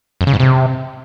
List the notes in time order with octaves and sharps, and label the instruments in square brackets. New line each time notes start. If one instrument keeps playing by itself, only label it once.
[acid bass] F2
C#3
G#2
C3